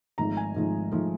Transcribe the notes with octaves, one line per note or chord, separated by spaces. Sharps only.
G#1 G#2 F3 A3 A#5
G#5
G#1 G#2 F3 A3
G#2 F3 A3